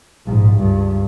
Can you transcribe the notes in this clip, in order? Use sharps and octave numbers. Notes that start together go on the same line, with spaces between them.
A#1 G#2
C#2 G2